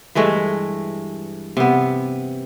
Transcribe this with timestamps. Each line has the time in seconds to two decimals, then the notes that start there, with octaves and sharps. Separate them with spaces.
0.15 G2 E3 G#3 A3
1.57 C3 B3